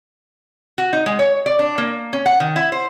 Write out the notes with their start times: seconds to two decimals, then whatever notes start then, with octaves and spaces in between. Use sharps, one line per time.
0.78 F#4
0.93 D#4
1.06 G#3
1.19 C#5
1.46 D5
1.59 D4
1.78 A#3
2.13 C#4
2.26 F#5
2.40 D#3
2.56 E4
2.72 C5